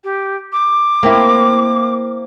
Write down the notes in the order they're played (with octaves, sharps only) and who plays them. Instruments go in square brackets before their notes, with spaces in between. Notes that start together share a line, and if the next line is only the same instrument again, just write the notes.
[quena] G4
D6
[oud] A#3 C4 E4